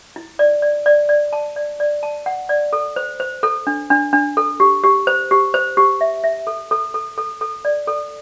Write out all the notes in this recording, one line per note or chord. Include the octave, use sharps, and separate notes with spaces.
E4
D5
D5
D5
D5
A5
D5
D5
A5
F#5
D5
A4
C5
C5
A4
D4
D4
D4
A4
G4
G4
C5
G4
C5
G4
E5
E5
A4
A4
A4
A4
A4
D5
A4